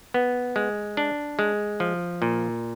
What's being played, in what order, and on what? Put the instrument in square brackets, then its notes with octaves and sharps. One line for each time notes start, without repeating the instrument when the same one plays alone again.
[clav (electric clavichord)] B3
G#3
D4
G#3
F3
A#2